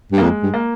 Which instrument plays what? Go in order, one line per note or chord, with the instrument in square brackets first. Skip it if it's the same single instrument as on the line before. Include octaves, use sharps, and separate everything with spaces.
[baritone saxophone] G2
[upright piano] A#3
[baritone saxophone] F2 [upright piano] G#3
[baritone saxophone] G2
[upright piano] A#3